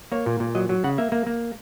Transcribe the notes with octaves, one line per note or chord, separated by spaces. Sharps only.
A#3 C#5
A#2
A#2
F#3 D#5
F#3
C#3 F#5
A#3 E5
A#3
A#3